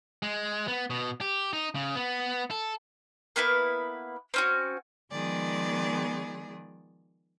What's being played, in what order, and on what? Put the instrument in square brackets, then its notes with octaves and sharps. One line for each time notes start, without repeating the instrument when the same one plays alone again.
[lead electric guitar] G#3
B3
B2
G4
D#4
C#3
B3
A4
[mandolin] A#3 B3 E4 B4
C4 C#4 F#4
[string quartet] D#3 F3 G#3 B3 G#4 D5